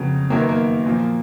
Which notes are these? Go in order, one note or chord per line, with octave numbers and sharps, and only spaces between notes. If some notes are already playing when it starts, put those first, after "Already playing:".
Already playing: F2 C#3 F#3 B3
F#2 D#3 F#3 A#3
B3
A#3
A#2 F3